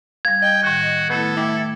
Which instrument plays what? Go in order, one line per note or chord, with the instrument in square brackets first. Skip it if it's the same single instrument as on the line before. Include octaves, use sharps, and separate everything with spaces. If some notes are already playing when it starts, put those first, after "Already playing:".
[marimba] G3 F5 [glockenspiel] G#6
[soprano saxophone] D#5 [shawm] G5
[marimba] A2 D#3 [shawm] F#4
[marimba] D#3 A3 E4 [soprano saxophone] B3 [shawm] A4
[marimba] A3 G5 D6 [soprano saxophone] E4